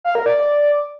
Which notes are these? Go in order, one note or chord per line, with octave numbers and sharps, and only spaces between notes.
F5
A#4
D5
D5